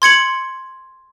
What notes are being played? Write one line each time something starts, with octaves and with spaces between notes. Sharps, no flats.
C6 G#6 C#7 F#7